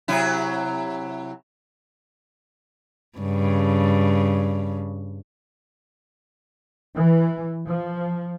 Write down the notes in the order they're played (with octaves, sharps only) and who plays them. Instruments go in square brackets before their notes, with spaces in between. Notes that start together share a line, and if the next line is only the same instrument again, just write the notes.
[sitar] C3 F#3 E4
[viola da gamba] G2 C#3
[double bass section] E3
F3